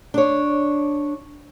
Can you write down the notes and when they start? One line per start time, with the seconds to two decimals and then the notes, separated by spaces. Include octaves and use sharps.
0.14 D4 C#5